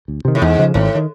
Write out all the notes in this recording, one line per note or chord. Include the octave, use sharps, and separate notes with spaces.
D2
C3 D#3
A2
E2 G#2
C#3 F3
G#1 A2
D#3